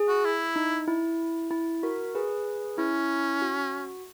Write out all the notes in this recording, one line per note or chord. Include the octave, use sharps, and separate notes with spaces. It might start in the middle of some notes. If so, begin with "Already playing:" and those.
Already playing: G#4
F#4
E4
D#4
E4
E4
F#4 A#4
G#4 B4
C#4 E4
F#4